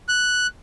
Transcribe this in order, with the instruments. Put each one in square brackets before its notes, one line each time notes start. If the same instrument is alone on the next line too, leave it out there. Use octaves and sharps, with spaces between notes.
[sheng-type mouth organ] F#6